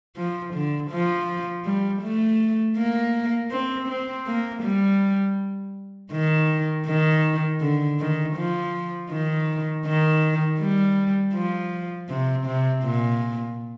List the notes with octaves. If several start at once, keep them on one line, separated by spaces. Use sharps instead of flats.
F3
D3
F3
G3
A3
A#3
C4
C4
A#3
G3
D#3
D#3
D3
D#3
F3
D#3
D#3
G3
F3
C3
C3
A#2